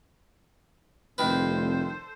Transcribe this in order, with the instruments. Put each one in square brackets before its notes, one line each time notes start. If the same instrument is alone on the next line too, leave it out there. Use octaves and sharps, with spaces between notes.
[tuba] F1 [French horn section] A2 G3 C4 [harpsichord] D#3 B4 [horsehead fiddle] A4 C5